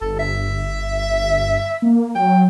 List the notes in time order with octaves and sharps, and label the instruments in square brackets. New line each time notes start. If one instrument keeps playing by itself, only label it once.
[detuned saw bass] G1 [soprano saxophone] A4
[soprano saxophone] E5
[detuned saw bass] A#3
[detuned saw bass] F#3 [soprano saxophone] G5